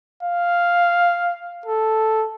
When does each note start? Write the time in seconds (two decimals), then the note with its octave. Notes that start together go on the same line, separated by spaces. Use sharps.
0.23 F5
1.66 A4